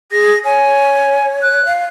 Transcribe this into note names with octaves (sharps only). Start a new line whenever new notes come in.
G#4 A#6
C#5 G#5
F#6
F5